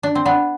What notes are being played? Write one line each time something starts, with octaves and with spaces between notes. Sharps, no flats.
D4
C4
B3 D4